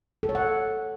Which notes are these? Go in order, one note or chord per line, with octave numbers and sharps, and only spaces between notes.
A4
C#5
F#5